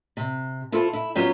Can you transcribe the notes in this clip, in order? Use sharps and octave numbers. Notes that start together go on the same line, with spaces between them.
C3
E4 F4 A4 C5
E4
F#3 B3 C#4 F4 G4